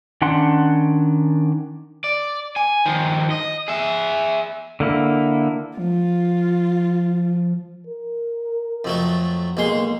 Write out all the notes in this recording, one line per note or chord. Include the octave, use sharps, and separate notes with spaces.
D#3 C#4 D4 F#5 C6
D5
G#5
D#3 F3
D#5
G#4 E5
D3 A#3 E4
F3 F4
A#4
F2 F#3 A3
B1 G#3 A#3 C6